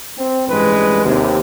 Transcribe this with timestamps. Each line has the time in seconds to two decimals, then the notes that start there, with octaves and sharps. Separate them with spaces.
0.17 C4
0.48 A1 G2 G#3 B4
1.04 D#2 C3